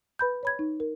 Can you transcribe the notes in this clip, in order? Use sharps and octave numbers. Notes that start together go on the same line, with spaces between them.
B4 B5 G6
C#5 B5 G#6
D#4
A#4